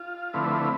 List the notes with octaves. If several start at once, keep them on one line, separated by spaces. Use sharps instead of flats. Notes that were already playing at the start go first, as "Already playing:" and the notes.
Already playing: F4
D3 F3 A3 C4 E4 B4